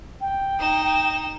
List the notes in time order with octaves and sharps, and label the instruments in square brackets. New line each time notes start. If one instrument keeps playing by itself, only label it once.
[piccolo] G5
[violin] D#4 E7